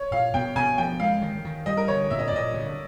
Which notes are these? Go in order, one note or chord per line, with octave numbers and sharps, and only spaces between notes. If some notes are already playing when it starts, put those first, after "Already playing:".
Already playing: C#5
A#2 F5
B2 G5
B2 G#5
F3 G5
G#3 F5
D#3
D#3
G3 D#5
A#4
D3 C#5
A#2 E5
D#5
D5
A#2 D#5
D3